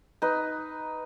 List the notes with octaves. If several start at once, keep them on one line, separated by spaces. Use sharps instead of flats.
D#4 B4